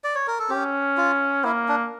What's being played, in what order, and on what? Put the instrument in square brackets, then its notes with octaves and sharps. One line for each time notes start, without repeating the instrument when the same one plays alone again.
[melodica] D5
C#5
A#4
A4
[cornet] C#4 [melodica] G4
[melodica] F4
[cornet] A#3 [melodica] E4
[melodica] D4